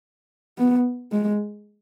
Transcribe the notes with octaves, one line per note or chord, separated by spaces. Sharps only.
B3
G#3